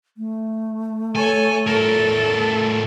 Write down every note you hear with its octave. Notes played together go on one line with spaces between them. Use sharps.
A3
A4 C#5 G#5
A2 A4 A#4